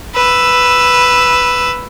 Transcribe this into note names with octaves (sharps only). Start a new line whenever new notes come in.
B4 E6